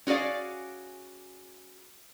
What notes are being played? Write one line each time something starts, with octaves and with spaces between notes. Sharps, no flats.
C#4 F#4 G#4 D5 F5